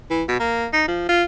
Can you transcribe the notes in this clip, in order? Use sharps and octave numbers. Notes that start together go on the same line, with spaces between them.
E3
B2
A#3
D#4
F3
F4